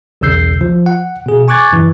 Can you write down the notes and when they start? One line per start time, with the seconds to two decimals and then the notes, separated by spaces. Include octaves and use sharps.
0.21 B1 E2 C#3 E6 G6 C7
0.61 F3
0.86 F#5
1.26 B2 G#4
1.48 G#5 C#6 D6 F#6 G#6 A6
1.72 F#2 E3